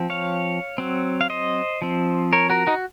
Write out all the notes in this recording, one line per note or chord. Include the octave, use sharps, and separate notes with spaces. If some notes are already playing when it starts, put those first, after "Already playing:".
Already playing: F3 C4
C#5 F5
F#3 C4
F5
C5 D#5
F3 C4
A#4 C#5
F#4 A#4
D#4 F#4